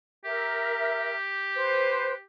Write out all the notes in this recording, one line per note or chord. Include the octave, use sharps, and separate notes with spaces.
G4 A#4 E5
B4 C5